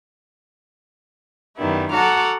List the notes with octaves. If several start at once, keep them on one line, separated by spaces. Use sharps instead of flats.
F#2 D#3 F#3 G3 B3 E4
F#4 A4 F#5 A#5 D6 F6